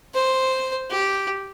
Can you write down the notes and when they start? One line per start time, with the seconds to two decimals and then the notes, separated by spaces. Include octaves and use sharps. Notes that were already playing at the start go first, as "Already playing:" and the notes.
0.14 C5
0.90 G4